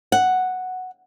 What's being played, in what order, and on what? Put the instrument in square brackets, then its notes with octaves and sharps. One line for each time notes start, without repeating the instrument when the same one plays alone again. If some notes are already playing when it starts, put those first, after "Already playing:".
[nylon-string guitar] F#5